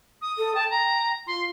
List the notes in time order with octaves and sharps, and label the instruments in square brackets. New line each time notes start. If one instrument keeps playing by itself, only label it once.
[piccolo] D#6
[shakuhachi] A4
[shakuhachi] G5 [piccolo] A5
[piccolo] A#5
[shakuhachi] F4 [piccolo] C6